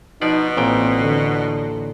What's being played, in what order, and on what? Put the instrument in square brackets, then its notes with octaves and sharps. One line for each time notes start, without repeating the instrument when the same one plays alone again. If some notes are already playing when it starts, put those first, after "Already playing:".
[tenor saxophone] B2 [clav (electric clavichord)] F3 D5 [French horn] D#4
[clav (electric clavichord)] A1 A#2 G5 [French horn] C4
[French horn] D3